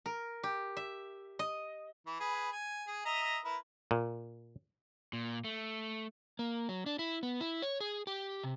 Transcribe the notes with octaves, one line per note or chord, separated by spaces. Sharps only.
A#4
G4
E5
D#5
E3
G#4 B4
G#5
G#4
D#5 E5 A#5
E4 A#4 B4
A#2
A#2
A3
A#3
F#3
D4
E4
B3
E4
C#5
G#4
G4
C3